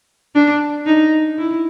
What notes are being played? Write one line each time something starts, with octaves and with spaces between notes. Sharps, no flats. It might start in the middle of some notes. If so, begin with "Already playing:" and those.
D4
D#4
E4